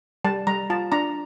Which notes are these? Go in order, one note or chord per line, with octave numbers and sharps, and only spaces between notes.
G3 A5
G3 A#5
F4 A5
D4 A#5